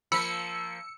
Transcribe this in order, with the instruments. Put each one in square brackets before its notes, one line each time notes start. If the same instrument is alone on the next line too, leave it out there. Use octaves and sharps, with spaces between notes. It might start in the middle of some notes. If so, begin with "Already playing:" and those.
[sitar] F3 A#3 [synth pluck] B5 [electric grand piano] E6 [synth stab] C#7